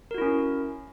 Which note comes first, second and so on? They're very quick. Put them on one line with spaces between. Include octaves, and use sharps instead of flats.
A#4 F#4 E4 C#4